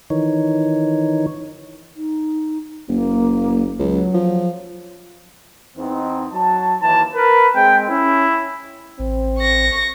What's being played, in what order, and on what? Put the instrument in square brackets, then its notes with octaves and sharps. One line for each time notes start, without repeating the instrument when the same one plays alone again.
[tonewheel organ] D#3 E3 D#4 C#5
[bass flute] D#4
[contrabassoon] F#1 [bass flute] A#3
[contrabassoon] C#2 [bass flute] F#3
[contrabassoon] F3
[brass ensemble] E2 C4 D#4
F#3 A5
[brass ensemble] D#2 E3 [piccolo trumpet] A5
[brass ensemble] A#4 [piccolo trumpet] B4
[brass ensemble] G#3 C4 [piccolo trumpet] G5
[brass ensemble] C#4 [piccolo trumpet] E4
[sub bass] A1 [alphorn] C4
[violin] C#6 A#6